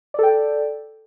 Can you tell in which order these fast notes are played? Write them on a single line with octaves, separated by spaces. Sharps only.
D5 A4 G5